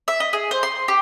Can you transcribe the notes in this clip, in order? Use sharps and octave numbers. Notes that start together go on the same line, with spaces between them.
E5
D#5
G#4
C5
C6
G4